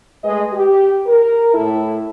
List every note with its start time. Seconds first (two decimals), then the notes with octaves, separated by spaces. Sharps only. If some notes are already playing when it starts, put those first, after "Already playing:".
0.24 G#3 A3 G#4 B4 D#5
0.53 G4
1.07 A#4
1.53 A2 E4 A4